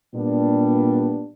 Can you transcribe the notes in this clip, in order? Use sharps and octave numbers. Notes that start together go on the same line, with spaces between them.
A#2 G3 B3 D4